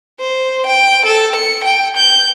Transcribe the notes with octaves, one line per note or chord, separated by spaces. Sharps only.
C5
G5
A4
C#7
G5
G6